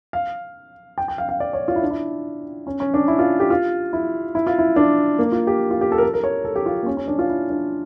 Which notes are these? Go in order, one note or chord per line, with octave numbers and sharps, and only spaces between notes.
F5
G5
G5
F5
F5
D5
C#5
F4
E4
D4
E4
C#4
C#4
D4
E4
F4
G4
F4
E4
E4
F4
E4
D4
A#3
F4
G4
F4
G4
A4
A#4
A4
A#4
C#5
A4
G4
F4
A#3
C#4
C#4
D4
F4
E4
D4